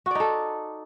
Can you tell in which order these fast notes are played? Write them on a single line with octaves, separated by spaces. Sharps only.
F#4 D5 D#4 A4